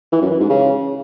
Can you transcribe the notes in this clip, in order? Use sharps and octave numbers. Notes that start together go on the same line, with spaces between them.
E3
F#2
E3
G#2
C#3